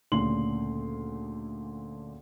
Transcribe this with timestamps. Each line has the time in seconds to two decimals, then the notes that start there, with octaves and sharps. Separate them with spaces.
0.12 D2 A#2 C#3 A3 C6 F#7